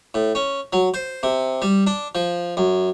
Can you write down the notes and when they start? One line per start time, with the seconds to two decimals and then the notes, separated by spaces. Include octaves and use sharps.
0.14 A2
0.35 C#4
0.73 F#3
0.94 C5
1.23 C3
1.62 G3
1.87 D4
2.15 F3
2.57 F#2